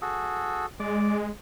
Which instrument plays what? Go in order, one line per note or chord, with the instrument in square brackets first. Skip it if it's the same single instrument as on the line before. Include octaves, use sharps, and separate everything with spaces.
[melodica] F#4 G#4 A4
[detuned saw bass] G#3 [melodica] D5 D6